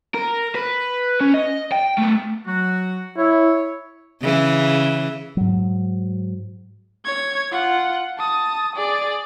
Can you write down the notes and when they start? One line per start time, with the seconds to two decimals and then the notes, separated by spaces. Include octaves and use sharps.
0.15 A#4
0.55 B4
1.21 C#4
1.34 D#5
1.72 G5
1.99 A3 B3
2.46 F#3 F#4
3.17 E4 C#5
4.22 C#3 E3
5.37 G#2 F#3
7.05 C#5 G#6
7.52 F4 F#5
8.18 A5 D#6
8.75 G#4 D5